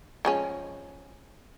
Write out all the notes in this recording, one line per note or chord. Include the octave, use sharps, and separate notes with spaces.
F3 G#3 C#4